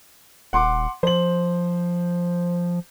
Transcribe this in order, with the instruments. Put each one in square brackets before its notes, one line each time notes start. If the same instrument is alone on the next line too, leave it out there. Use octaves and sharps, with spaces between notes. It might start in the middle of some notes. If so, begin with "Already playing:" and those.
[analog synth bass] D#1 [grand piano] F#5 C6 D6
[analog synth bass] F3 [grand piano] C5 F#7